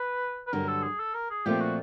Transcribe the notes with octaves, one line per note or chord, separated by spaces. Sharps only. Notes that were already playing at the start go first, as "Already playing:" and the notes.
Already playing: B4
B4
G2 D3 F#3 A#4
A4
G#4
A4
A#4
G#4
A#2 F3 A3 C4 G4
F#4